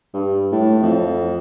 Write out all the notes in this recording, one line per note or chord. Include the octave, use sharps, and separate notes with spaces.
G2
A2
F2